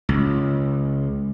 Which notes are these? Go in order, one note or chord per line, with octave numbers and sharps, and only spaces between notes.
C#2